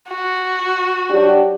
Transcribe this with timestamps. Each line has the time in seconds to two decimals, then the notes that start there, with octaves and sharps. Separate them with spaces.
0.11 F#4
1.09 F#3 D4 G4